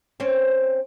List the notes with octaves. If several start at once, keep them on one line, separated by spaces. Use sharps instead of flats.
C4 C#4